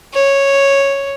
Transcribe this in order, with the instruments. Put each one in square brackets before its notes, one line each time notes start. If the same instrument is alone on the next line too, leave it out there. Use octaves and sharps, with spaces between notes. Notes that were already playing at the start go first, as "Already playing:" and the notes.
[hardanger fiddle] C#5